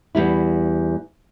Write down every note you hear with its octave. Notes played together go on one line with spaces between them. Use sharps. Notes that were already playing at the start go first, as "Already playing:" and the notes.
E2 G3 E4